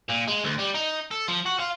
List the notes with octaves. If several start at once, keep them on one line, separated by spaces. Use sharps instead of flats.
A#2
G#3
D2
G3
D#4
A4
F3
F#4
F4